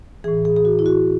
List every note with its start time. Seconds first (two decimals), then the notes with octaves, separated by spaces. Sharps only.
0.24 E3 G#4
0.28 A2
0.45 G#4
0.56 G#4
0.65 F#4
0.79 E4
0.86 F#4